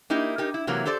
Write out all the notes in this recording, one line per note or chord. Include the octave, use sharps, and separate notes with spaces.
A#3 D#4 E4 G4
D#4 G4 A#4
E4
C3 E3 F#3 A#3 A#5
G4 A4 C5 D5